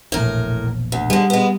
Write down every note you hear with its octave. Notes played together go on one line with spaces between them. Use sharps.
E1 A#1 A2 A#4
D2
D3 G3 G#3
G#3 B3